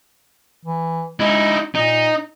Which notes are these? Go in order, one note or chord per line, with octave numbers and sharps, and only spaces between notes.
E3
G#3 D#4 E4
A#2 D#4